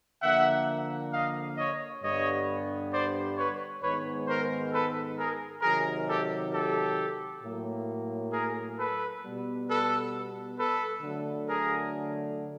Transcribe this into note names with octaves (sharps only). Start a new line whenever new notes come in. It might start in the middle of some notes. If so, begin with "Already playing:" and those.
D3 F3 A#3 E5 F#5
D#5 F5
C#5 D#5
G2 D3 G3 B3 C#5 D#5
C5 D5
B4 C#5
G#2 D#3 G#3 B3 B4 C#5
A#4 C5
A4 B4
G#4 A#4
C3 D#3 F#3 G#4 A#4
G4 A4
G4 A4
A2 F#3 A#3
G#4 A#4
A4 B4
B2 G3 B3
A4 B4
A4 B4
D3 F#3 A3
G#4 A#4